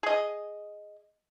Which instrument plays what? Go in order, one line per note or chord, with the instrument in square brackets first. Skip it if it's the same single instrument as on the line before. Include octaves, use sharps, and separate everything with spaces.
[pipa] G#4 D#5